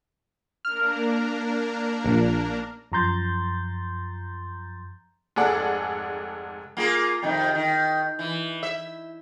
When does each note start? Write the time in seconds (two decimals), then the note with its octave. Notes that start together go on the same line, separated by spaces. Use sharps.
0.65 A#3 D4 A#4 F6
2.04 A#1
2.92 F#2 F3 A#5 C6 G6 A6
5.36 F1 G#2 G#4 A4 D5 F#5
6.77 A#3 F4 G#4
7.22 F2 C3 D#3
7.55 D#3
8.19 E3
8.63 E5